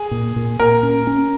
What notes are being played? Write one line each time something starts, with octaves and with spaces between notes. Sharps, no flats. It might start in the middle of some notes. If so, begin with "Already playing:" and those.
Already playing: G#4
A#2
A#2
A#2 A#4
C#4
C#4